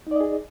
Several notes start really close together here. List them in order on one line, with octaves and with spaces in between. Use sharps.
D#4 D5 D#5 G#4